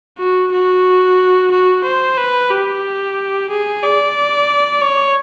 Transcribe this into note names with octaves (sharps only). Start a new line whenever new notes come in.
F#4
F#4
F#4
C5
B4
G4
G#4
D5
C#5